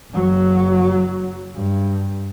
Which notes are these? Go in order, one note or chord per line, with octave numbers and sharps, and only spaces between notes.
F#1 F#3
G2